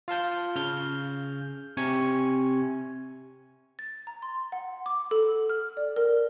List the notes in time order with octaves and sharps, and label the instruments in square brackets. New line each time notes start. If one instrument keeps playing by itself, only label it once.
[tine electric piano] F4 F5 A5 G6
C#3 F6 G6
C3 C4 G#5 C#6 G#6
[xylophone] A6
A#5
C6
F#5
D6
A4
F6
D5
A#4